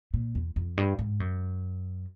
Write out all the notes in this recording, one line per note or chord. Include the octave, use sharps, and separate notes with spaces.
A#2
E2
F2
G2
G#2
F#2